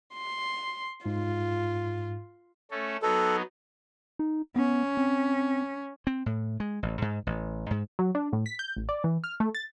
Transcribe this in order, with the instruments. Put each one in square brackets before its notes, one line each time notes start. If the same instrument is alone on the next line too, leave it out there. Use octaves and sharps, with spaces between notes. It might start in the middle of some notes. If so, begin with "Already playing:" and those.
[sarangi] C6
[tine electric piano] G#2 [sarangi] F4
[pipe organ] A3 C#4 A4
[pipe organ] F#3 B3 D#4 [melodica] A4
[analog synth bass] D#4
[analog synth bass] B3 [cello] C#4
[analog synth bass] C4
[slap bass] C4
A2
G#3
A1
G#2
A1
G#2
[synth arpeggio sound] F#3
D4
A2
B6
G6
A1
D5
E3
F6
A3
A6